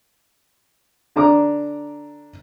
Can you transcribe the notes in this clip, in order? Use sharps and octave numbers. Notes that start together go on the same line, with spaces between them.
D3 D4 A#5 D6